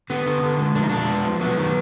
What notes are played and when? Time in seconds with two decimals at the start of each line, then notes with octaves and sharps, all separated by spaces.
0.10 D3 B3
0.26 D3
0.43 D3
0.59 G#3
0.75 F3 D4
0.83 D#4
0.89 G#3 D4
1.08 B3
1.24 F3
1.40 F#3 B3
1.57 D#3